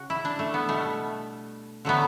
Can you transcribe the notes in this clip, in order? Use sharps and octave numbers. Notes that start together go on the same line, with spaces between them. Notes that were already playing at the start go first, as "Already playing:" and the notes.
Already playing: C#3 F#4
E4
D4
A3
B3
B2 G3 A3
D3 F#3 A3 B3